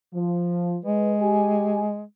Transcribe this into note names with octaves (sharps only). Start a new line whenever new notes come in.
F3
G#3 B4
G4 G#5